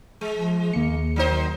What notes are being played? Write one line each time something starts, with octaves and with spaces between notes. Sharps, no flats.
G#3
F3
D#2 A#3 C#7
D#3 F#3 D#4 C5